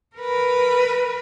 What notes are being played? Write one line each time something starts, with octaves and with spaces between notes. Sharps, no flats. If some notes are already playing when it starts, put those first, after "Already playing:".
A#4 B4